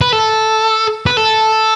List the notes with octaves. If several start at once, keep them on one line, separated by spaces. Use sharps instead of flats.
B4
A4
B4
A4